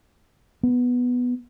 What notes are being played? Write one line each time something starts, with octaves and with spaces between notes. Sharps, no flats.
B3